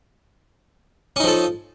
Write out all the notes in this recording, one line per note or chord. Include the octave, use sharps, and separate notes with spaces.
F3 C#4 D#4 A4